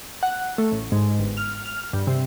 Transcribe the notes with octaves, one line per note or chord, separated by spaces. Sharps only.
F#5
A3
A1
G#2
G1
F6
F6
G2
C3